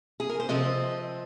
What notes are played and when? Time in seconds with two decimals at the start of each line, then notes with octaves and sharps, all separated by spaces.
0.20 G#4
0.29 A#4
0.40 C5
0.49 C3 F3 C4 D#5